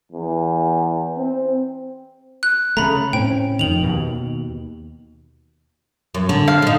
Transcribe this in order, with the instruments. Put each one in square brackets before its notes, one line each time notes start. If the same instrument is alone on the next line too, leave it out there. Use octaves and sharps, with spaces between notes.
[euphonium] E2
C4
[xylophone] F#6
[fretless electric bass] C#3 A3 [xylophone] A#5 B5
[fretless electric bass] A2 C4 C#4 [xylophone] G5
[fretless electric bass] F2 D#3 [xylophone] F7 F#7
[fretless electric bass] D#2 B2
[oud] F#2
D3
[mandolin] F5
[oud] D3 D#4